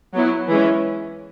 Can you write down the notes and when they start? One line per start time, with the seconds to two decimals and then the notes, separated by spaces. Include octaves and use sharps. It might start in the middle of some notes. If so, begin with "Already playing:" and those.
0.14 F#3 B3 E4
0.49 E3 G#3 C#4